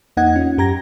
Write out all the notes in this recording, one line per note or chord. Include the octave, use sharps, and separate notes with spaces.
E2 A#3 D#4 D#5 F#5 G#6
C#4 F4
F#2 G4 A#5 G#6 A#6